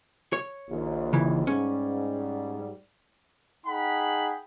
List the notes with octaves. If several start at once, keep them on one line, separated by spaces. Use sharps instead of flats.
C#5
A#1 D#2
C#3 E3
G#2 G3 C#4
D#4 G#4 F#5 G5 B5